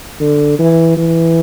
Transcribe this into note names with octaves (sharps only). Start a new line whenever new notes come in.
D3
E3
E3